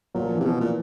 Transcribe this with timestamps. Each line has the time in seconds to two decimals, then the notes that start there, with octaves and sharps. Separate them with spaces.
0.15 A#2 F#3
0.24 F3
0.36 E3
0.40 C3
0.46 B2
0.60 A#2 E3